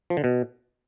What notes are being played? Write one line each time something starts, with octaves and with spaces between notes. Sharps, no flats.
F3
D3
B2